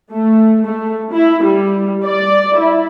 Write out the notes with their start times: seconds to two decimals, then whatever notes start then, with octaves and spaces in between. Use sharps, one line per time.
0.11 A3
0.64 A3
1.13 E4
1.44 G3
2.04 D5
2.56 E4